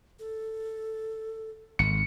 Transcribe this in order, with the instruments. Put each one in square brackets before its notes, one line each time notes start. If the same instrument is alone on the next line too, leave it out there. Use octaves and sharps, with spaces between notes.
[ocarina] A4
[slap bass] G#1 [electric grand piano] C#7